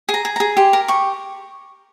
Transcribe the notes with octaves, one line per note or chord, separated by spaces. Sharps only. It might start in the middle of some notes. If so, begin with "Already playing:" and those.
G#4
A#5
G#4
G#4 A#5
G4 C6
A#4
G4 C#6